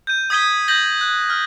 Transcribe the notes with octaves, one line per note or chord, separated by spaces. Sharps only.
G6 D#7
D#6 G#6 B6 D#7 G7
G6 A#6 F#7 G7
F#6
F6